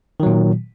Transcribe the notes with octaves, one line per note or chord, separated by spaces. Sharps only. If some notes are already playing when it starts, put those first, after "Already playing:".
A#2 D#3 F#3